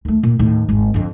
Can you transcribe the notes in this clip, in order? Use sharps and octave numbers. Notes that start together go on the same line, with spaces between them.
D#2 A3
A#2
D#2 A2
G#1 E2
F2 D3